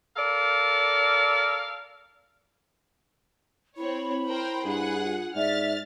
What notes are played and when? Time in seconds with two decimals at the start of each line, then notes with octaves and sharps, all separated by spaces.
0.16 A4 A#4 D5 F5
3.77 C4 E4 C#5 B5
4.28 A#4 C5 G5
4.65 G2 G#4 F#5
5.04 F4
5.35 G#2 D5 E5 F6 A6